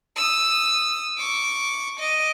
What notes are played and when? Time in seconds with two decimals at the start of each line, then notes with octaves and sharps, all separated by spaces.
0.16 D#6 E6
1.18 C#6 D6
1.99 D#5 D6